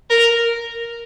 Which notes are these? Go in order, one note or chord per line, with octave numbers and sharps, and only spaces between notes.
A#4